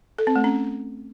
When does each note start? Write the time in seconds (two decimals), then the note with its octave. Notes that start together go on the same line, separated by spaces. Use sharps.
0.18 A4
0.27 C4
0.36 A3
0.44 C#4